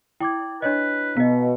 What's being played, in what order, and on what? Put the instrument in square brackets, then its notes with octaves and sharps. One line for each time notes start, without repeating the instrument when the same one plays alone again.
[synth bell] E4 [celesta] G5 D6 G#6
[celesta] D4 C#5 D#5 [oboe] B4
[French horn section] B2 [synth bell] B3 [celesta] D#5 B6